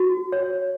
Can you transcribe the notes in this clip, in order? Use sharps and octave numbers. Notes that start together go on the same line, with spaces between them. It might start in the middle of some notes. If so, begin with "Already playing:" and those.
Already playing: F#4
C#5